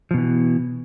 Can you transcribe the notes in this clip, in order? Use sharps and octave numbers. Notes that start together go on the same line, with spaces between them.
B2 E3 F3